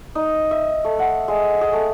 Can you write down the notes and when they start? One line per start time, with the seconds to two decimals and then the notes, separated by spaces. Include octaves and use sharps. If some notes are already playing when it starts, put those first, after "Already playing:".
0.15 D#4
0.51 E5
0.84 A3
0.99 F#5
1.28 G#3
1.61 G#4
1.73 A3